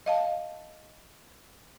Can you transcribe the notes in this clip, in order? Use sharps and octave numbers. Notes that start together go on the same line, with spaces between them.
D#5 F5 A5